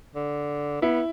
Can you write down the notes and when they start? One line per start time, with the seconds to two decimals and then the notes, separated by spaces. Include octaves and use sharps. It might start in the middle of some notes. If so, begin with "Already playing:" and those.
0.15 D3
0.82 B3 E4